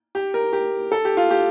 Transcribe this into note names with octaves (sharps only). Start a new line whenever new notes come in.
G4
A#4
G4
A4
G4
F4
G4